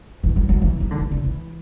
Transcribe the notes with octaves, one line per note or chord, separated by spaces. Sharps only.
E3
F#3
F#3
E3
F#3
D3
E3
D3
E3